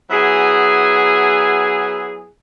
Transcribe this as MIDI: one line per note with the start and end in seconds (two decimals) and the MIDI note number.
0.10 2.28 54
0.10 2.28 59
0.10 2.28 64
0.10 2.28 68